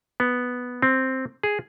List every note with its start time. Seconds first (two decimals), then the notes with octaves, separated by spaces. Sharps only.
0.20 B3
0.82 C4
1.43 G#4